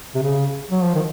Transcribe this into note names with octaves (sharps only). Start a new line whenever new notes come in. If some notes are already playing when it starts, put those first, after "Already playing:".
C3
C#3
F#3
F3
D#3